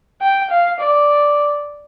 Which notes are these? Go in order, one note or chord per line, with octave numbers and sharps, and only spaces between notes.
G5
F5
D5